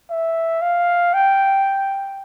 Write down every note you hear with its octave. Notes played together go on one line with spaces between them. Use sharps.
E5
F5
G5